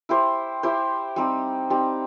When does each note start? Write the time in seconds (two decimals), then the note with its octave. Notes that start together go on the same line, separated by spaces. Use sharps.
0.09 E4 G4 C5
0.63 E4 G4 C5
1.16 G3 C4 D#4 G4
1.70 G3 C4 D#4 G4